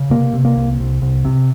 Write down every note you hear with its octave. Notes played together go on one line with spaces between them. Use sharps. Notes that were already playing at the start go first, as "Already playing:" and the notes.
Already playing: C#3
C3 A#3
C3
A#3
C2
C2
C2
C3